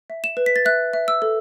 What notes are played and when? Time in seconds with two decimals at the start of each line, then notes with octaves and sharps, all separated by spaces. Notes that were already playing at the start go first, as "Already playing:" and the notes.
0.10 E5
0.24 E7
0.37 B4
0.46 B6
0.56 A6
0.65 E5 F#6
0.93 E5
1.08 E6
1.22 A4